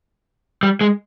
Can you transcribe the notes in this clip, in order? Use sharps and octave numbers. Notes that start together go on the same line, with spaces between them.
G3
G#3